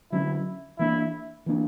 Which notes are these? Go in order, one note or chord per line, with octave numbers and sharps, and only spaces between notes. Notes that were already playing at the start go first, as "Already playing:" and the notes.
D3 F#3 C#4 E4
E3 A#3 D4 E4
E3 A#3 D4